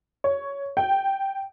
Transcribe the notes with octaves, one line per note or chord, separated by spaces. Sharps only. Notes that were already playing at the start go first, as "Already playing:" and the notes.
C#5
G5